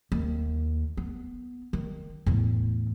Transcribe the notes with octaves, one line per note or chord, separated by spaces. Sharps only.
D#2
B3
D#3
E2 A2